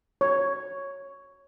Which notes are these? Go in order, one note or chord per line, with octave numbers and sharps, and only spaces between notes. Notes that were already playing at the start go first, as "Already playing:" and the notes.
C#5